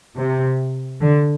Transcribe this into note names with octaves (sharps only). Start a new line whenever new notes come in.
C3
D3